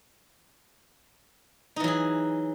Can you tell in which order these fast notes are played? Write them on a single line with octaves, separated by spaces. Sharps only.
D#4 E3 F#3 G#4